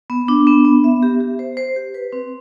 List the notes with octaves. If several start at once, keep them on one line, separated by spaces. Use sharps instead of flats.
B3
D4
B3
B3
E5
G4
G4
C5
C5
G4
B4
C4